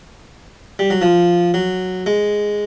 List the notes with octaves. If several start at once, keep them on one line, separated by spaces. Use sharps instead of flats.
G3
F#3
F3
F#3
G#3